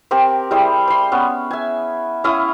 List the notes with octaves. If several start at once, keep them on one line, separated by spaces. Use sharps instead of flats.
C4 G4 A#4 C5
G3 E4 G#4 C5
C5 C6
B3 C#4
E5 G#5
C#4 E4 F5 D#6